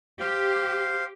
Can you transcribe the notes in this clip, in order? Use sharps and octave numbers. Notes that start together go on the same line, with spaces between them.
G4 C5 F5